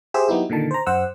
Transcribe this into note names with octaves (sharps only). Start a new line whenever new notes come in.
G4 G#4 C5 E5 E6
F#3 B3 D#4 E4 G4
A#2 D3 D#3 A5
C5 A#5
F#2 C5 F#5 E6